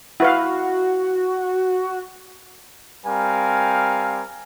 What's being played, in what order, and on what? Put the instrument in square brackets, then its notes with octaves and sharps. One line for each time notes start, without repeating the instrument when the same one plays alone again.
[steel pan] E4 B4 F5 [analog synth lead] F#4
[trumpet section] G3 C4 A#4 F5 G#5